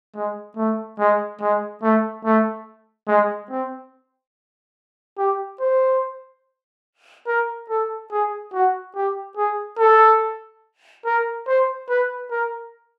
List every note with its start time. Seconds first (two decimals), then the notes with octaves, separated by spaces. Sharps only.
0.15 G#3
0.57 A3
0.99 G#3
1.41 G#3
1.83 A3
2.25 A3
3.08 G#3
3.50 C4
5.18 G4
5.60 C5
7.27 A#4
7.70 A4
8.11 G#4
8.53 F#4
8.95 G4
9.37 G#4
9.79 A4
11.05 A#4
11.47 C5
11.89 B4
12.31 A#4